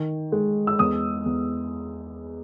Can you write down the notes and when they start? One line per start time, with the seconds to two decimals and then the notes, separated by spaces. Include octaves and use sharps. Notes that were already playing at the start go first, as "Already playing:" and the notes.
Already playing: D#3
0.32 G#3
0.67 E6
0.79 E2 D#6
1.26 E2